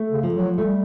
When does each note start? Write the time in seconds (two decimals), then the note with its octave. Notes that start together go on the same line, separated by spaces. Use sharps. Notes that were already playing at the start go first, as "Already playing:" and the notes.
Already playing: A3
0.11 C#3
0.23 F3
0.34 F#3
0.58 G3 A3